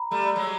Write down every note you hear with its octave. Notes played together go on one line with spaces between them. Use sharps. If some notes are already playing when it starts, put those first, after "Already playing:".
Already playing: A#5 B5
G3 A3 A#5
F#3 G#3